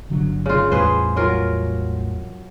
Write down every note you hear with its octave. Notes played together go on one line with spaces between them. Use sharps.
G1 D3 F#3
C#3 F4
A1 E2 G3 G#4 B4 C5
F#3 F4 A#4